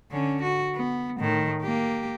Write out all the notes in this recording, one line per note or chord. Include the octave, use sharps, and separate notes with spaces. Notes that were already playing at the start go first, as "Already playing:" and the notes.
D3 C#4
F#4
B3
A2 D#3
A#3 G4